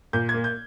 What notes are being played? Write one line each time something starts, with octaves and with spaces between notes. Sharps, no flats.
A#2 G6
G#6
A#3
G6